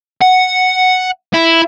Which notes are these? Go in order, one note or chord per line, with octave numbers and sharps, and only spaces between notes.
F#5
E4